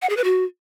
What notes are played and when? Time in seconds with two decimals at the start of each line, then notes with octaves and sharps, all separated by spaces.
0.02 F#5
0.09 G#4
0.17 B4
0.24 F#4